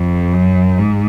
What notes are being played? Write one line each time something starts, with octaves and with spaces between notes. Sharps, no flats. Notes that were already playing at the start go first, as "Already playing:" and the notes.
Already playing: F2
F#2
G#2